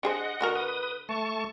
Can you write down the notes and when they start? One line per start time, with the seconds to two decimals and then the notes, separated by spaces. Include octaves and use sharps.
0.03 D4 G#4 C5 D#5 F#5
0.41 D3 F#4 A#4
0.55 B4 D#6
1.09 A3 A5 C#6